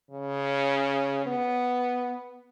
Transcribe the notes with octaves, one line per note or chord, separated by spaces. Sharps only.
C#3
B3